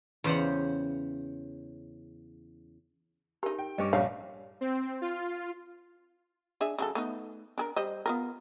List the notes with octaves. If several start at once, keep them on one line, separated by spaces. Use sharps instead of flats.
E2 C#3 G4 C5 F5 F#5
D#4 G4 A#4
G5
G2 C#4 D#5 D6
A#1 G3 C#5 F5
C4
F4
D4 G#4 E5
C#3 F#3 A4
A3 B3 D#4
D4 G#4 A#4
G3 C5 D#5
B3 F4 A#4